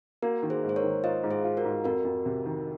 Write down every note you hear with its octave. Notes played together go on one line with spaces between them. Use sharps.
A#3 F#4 A#4
D#3
G#4 C5
G#2
C5
A#4 C#5
D#3
F4 C5 D#5
G#2
G#4 C5
F4
F#4 A#4
G#2
F2 F#4 A#4
F2
C3
D#3